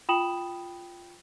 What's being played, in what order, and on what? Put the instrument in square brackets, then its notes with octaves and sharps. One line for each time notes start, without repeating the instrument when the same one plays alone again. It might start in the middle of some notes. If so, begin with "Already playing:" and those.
[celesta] F4 G5 B5 D#6 E7 F#7